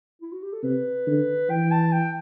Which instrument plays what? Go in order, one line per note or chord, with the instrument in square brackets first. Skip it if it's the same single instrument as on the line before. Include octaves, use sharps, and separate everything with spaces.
[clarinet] E4
F#4
G4
A4
[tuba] C3 [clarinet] B4
[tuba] D3
[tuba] E3 [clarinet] G5
[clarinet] A5
G5